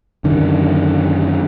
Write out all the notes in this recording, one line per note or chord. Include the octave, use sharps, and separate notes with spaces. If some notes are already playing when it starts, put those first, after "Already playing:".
F#2 D3 D#3